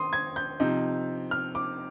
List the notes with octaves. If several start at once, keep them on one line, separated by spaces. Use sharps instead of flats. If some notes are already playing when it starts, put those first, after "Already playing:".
Already playing: D#3 C6 D#6
G#6
G6
C3 F3 C4 D#4
F6
D6